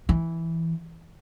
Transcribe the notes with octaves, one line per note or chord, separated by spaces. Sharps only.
E3